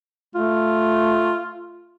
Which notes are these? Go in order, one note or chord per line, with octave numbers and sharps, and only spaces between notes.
A3 F4